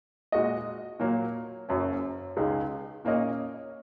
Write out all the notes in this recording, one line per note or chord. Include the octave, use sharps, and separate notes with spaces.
A#2 G#3 F#4 D#5
A#2 F#3 A#3
F#1 F#2 F#3 C#4
C#2 C#3 G#3 D#4 G#4
A#2 A#3 C#4 A#4 D#5